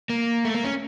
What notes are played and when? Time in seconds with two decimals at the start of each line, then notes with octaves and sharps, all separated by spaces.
0.10 A#3
0.45 A3
0.55 A#3
0.64 C#4